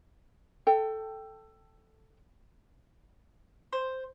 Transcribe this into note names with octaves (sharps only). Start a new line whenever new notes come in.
A4 G5
C5